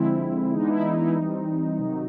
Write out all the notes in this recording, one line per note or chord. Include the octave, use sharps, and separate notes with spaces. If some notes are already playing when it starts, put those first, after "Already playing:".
Already playing: D3 F3 G#3 C4 E4
E3 G#3 B3 D4 D#4
E4
D#4
E4
D#4
E3 G3 C4
C3 D#3 F#3